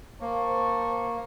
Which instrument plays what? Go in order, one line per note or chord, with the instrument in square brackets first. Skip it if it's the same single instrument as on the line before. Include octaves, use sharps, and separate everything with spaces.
[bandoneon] A#3 [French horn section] C5 [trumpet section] A5 C#6